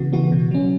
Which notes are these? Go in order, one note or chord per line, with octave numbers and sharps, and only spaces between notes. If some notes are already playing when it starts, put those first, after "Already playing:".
Already playing: C#3 E3 B3 F#4
E3 B3 F#4
B2
F#3 C#4